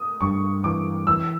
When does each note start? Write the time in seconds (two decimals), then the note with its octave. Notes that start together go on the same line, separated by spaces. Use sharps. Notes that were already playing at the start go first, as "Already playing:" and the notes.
Already playing: D#6
0.21 G2 C#6
0.64 E3 D6
1.07 E3 E6